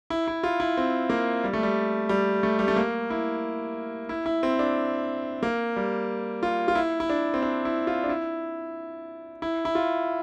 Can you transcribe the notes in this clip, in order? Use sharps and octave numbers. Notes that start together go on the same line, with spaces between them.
E4
E4
F4
E4
C4
A#3
G3
A3
G3
G3
A3
G3
A3
A#3
E4
E4
E4
C4
D4
A#3
G3
F4
F4
E4
E4
D4
C4
D4
E4
F4
D4
E4
E4
E4
F4